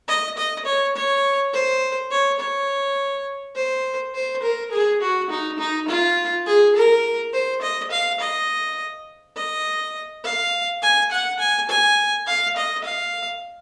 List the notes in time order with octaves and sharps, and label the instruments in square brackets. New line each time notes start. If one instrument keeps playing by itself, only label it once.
[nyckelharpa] D#5
D#5
C#5
C#5
C5
C#5
C#5
C5
C5
A#4
G#4
F#4
D#4
D#4
F4
G#4
A#4
C5
D#5
F5
D#5
D#5
F5
G#5
F#5
G#5
G#5
F5
D#5
F5